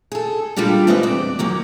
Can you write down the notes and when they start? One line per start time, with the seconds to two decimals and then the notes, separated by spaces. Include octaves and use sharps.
0.12 G#4 A4
0.56 A#2 G3 G#3 D4 F4 G4
0.87 A3 C4 D#4 G#4 B4 D#5
1.03 E2 D5
1.39 D#3 F#3 G#3 A#3